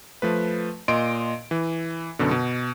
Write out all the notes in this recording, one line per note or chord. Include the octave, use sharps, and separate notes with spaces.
F3 A3 B4
A#2 D#5 C6 D7
E3
F#2 B2 D3
B2